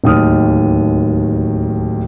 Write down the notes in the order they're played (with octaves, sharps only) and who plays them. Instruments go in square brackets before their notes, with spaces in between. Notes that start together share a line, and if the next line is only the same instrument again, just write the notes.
[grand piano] D1 D#2 D#3 D#6 F6